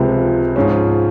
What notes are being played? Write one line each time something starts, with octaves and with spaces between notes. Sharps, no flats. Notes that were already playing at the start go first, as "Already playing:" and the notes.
Already playing: C#2 C3 F3 G#3
G#2 F3 G#3 C#4